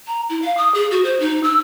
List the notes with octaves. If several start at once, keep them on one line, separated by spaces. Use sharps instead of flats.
A#5
E4
F5
D#6
G#4
F#4
C5
D#4
E6